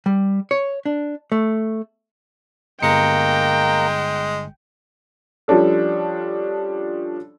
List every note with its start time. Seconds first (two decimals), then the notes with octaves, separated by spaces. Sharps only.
0.06 G3
0.51 C#5
0.86 D4
1.32 A3
2.82 G1 G#3 A#3 G5 A#5 C#7
5.48 F3 G3 C#4 D4 A4